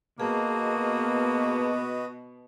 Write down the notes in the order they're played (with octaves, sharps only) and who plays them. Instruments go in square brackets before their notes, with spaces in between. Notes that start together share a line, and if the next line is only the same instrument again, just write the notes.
[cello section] B2 [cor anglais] A#3 [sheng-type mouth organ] F#4 B4 D#5 [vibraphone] G#4 A5